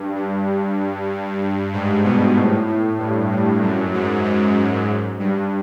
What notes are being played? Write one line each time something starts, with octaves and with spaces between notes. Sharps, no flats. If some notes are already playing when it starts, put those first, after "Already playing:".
Already playing: G2
G2
G2
G#2
B2
A2
A2
G2
G2
F#2
G#2
G#2
G2